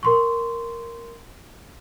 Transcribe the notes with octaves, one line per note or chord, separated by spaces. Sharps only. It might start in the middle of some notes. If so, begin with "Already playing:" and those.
A#4 C6 C#6